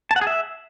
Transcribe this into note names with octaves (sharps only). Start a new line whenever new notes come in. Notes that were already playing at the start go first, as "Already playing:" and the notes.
A5
F#5
G#4
E5